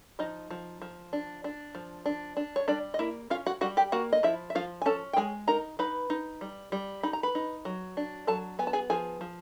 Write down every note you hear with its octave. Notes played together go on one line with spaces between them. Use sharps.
F3 D#4 D#5
F3
F3
D4
D4
F3
D4
D4
C#5
G3 D4 D5
D#5
A#3 E4 E5
C#4 F4 F5
F#4 F#5
G3 F#4 F#5
G4 G5
A#3 F#4 F#5
D#5
F3 E4 E5
E5
F3 F4 F5
G#5
C#4 A4 A5
G5
G#3 G#4 G#5
D#4 A#4 A#5
D#4 B4 B5
D#4
G3
G3
D#4 B5
A#5
B4 B5
D#4
F#3
D4
F#3 A4 A5
B3 G#5
A5
G#4 G#5
F3 G#4 G#5
F3